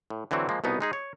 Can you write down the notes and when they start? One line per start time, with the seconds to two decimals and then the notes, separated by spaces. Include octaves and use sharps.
0.10 A2
0.31 D3 E3 F#3 C4 F#4
0.49 F3 G#3 A#3
0.64 C2 B2 B3 D#4
0.80 G#3 D#4 G#4
0.93 C#5